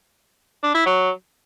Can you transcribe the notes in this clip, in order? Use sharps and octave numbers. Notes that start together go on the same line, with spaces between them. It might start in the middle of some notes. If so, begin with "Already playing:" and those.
D4
E4
F#3